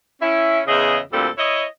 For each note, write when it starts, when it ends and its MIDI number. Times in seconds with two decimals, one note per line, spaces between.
0.22 0.60 61
0.22 0.60 64
0.66 0.98 40
0.66 0.98 49
0.66 0.98 68
0.66 0.98 75
0.66 0.98 76
1.12 1.27 38
1.12 1.27 46
1.12 1.27 55
1.12 1.27 60
1.12 1.27 69
1.37 1.63 64
1.37 1.63 73
1.37 1.63 75